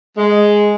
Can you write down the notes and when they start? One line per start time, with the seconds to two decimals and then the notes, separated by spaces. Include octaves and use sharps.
0.17 G#3